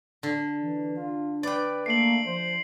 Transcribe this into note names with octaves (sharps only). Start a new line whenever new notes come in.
D3
E3
D4 F4
B4 D5 G5
A3 A#3 C7 D7 F#7
F3 C5